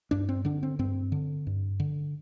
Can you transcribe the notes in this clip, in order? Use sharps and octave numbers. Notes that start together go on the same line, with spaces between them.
G2 D4
C4
D3 D4
C4
G2 C4
D3
G2
D3